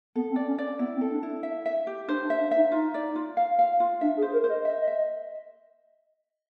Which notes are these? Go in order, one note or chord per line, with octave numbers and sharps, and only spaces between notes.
B3 A4
C4
D5
C#4
D5
B3 E4
C4
A4
D4
E4
E5
E5
G4
D4 C5
D4
E5
D4
D#4 E5
D#4 F4
D5
F4
F5
F5
F4
D4 E5
G#4
C5
A#4
C5
D#5
D#5 E5
D#5
E5
D#5